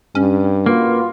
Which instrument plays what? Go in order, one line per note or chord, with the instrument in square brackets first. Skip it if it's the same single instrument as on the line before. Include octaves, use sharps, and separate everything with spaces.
[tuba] G2 [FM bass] C#4
[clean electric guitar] A#3 [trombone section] F4 F#4 B4